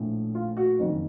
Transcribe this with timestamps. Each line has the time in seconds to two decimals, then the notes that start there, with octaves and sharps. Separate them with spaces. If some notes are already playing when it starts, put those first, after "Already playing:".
Already playing: A#1 A2 F3
0.35 F4
0.57 F#4
0.79 F#1 F2 D#3